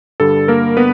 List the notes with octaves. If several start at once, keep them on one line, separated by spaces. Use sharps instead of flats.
G2 D3 G3 A4
A#3 A#4
B3 B4